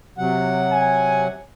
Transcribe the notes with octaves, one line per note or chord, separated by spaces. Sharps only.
C3 F#3 F#5
G#5